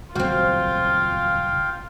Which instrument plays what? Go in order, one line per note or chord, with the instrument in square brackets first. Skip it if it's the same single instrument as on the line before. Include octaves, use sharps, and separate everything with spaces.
[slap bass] D#1 C#2 F#3 [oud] C4 F#4 [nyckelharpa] F4 [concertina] F5 G5